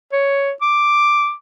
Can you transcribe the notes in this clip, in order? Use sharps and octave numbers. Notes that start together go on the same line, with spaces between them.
C#5
D6